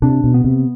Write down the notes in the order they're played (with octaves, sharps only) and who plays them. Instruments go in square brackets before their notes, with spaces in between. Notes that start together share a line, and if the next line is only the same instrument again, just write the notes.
[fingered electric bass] C3 [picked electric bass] D4
[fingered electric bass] B2
[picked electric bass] B3
[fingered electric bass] C3